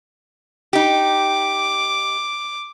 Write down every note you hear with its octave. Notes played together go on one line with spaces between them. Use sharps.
D#4 G4 D6